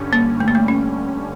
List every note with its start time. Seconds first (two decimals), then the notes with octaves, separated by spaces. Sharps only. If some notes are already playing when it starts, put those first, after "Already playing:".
Already playing: G2 D3 G3 C#4
0.13 A#3
0.40 A3
0.48 A#3
0.55 A3
0.68 C#4